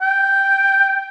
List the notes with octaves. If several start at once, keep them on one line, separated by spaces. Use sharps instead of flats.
G5